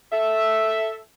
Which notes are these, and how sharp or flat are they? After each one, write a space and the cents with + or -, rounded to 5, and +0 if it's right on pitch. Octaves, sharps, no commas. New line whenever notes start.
A4 +0 E5 +0